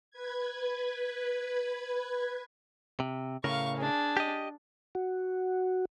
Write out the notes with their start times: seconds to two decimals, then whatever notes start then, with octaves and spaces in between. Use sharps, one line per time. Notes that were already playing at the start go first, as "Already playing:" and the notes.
0.11 B4 G#6
3.00 C3
3.44 A2 C#3 A#4 F5 C#6
3.77 D4 G#4
4.17 G4 D#5
4.95 F#4